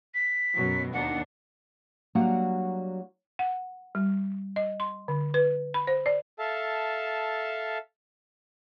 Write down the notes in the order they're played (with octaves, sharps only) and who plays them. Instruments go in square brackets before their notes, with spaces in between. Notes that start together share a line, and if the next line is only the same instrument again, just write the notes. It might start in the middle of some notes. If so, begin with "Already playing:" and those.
[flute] B6
[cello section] F#2 B2 F#3
[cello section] D#2 D4 D#4 [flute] F#5
[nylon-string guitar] F#3 G3 A#3 D4 F#4 F#5
[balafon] F#5
G3
D#5
C6
D3
B4
B5
C5
D5
[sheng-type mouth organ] A4 E5 F5 A5